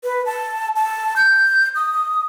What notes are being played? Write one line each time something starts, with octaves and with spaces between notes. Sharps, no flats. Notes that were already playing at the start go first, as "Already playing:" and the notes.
B4
A5
A5
G6
D#6